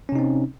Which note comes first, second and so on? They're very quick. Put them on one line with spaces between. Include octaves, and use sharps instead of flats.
C#4 C3 D#4 C4